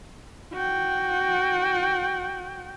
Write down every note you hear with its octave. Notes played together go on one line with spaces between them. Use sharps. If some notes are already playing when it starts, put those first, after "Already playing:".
F#4 G5